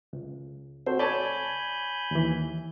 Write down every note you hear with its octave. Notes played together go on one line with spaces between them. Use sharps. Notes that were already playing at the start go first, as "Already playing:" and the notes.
C#2
C4 F#4 A4 C5
C#5 D5 G#5 A5 B5 G6
D#2 E3